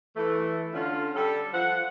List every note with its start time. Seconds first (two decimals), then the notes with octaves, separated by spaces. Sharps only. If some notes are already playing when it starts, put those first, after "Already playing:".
0.16 E3 A3
0.73 D3 C#4 F4
1.14 G3 A4
1.52 F3 F#5